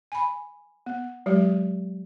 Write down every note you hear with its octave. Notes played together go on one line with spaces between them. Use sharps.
G#5 B5
B3
F#3 G#3 G4